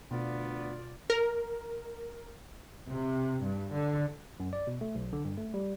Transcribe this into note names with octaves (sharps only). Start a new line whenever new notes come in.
D2 B2 B3 F4 D5
A#4
C3
G2
D3
F#2
D5
B2
A3
B1
D3
G2
A3
G3